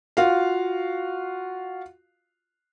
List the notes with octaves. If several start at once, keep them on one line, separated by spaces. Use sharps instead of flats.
F4 F#4 F5